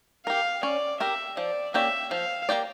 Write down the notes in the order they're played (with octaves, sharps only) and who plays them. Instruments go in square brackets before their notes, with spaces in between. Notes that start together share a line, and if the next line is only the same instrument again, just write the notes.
[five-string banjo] G4 A#4 [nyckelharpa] F5
[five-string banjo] C#4 [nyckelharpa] D5
[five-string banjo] G4 A#4 [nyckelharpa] E5
[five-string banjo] F3 [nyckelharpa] D5
[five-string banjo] A#3 C#4 G4 D5 [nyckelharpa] E5
[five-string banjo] F3 [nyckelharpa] F5
[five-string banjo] A#3 C#4 G4 D5